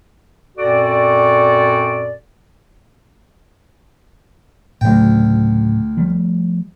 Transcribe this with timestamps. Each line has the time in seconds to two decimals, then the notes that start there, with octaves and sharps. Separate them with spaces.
0.57 F#2 A#2 C4 F#4 A4 D5
4.81 D2 A2 C#3 F#3 G5
5.97 F3 G3 A3